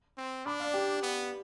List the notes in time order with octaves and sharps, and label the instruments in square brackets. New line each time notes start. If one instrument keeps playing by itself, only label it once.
[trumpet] C4
[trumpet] D4 [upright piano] B5 D6
[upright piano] D5 F5
G4
[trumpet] B3